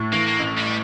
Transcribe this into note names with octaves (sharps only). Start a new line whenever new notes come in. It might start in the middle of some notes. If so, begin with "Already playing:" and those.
Already playing: A2
E3 A#3
A#3
A1
G3